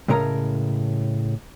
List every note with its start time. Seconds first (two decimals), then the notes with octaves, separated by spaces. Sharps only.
0.08 A2 C#3 G#3 C#4 A#4 A#5